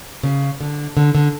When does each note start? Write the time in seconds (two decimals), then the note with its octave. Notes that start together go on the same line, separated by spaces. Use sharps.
0.23 C#3
0.61 D3
0.97 D3
1.15 D3